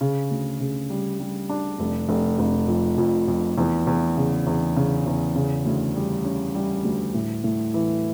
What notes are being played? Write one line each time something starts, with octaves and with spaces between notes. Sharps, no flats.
C#3
D2
C#3
G3
G3
D4
F1
F1
F1
F2
F2
F2
E2
E2
C#3
E2
C#3
E2
C#3
D2
G3
C#4
G3
D2
A2
A2
E3